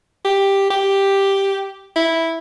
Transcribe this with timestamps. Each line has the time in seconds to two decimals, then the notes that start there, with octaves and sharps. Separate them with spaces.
0.25 G4
0.71 G4
1.96 E4